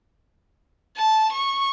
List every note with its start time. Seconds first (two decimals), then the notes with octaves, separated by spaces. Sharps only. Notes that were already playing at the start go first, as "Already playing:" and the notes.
0.97 A5
1.32 C#6